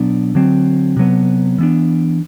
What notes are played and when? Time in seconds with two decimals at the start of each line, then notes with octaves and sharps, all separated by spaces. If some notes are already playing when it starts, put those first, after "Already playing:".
Already playing: B2 F#3 B3 D4
0.35 D3 F#3 C4
0.97 C3 F#3 B3
1.59 E3 B3 D4